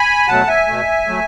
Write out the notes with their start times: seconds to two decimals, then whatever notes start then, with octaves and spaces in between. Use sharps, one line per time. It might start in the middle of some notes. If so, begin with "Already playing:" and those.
Already playing: G#5 B5
0.28 B2 F#3 A3 F#5 A5
0.48 E5 G#5
0.67 B2 A3
1.07 F#3 A3